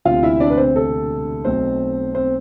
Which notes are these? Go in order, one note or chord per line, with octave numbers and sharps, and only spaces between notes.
E1 D2 C3 F4 F5
E4 E5
D4 D5
B4
C4 C5
A4
B1 B2 A3 C4 C5
C4 C5